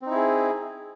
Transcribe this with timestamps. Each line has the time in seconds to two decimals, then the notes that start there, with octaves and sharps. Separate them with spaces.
0.02 C4
0.06 D#4
0.11 E4
0.15 G#4